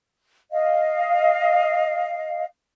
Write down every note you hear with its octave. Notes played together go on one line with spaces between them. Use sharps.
D#5 F5